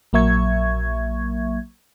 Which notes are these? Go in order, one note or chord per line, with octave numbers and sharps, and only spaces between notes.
A#1 F#3 A#3 E5 C#6 G#6